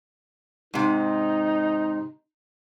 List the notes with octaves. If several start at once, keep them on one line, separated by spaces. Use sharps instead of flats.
G#2 C3 D#4